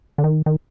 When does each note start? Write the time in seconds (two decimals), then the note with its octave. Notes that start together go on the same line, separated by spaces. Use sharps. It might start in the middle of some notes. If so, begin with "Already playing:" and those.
0.18 D3
0.24 D#3
0.46 D#3